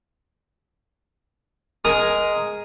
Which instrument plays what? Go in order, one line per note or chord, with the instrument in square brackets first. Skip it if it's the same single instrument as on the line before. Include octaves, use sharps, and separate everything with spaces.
[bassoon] G#3 [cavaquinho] A#4 G#5 [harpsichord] D#6